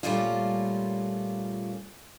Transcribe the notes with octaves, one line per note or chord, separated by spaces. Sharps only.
A#2 G3 A3 A#3 C#4 F4